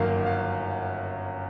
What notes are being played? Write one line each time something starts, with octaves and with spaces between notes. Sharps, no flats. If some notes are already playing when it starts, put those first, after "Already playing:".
Already playing: G1 F#2 D#3 F#3 A#3 F5
F5